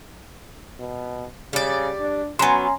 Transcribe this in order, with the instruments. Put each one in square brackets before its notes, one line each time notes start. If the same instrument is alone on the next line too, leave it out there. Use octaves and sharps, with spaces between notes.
[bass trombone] B2
[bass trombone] C#3 [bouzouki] G3 D5
[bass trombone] D4
[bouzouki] F#3 B3 [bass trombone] C#4 [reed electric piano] G#5 A#5 C6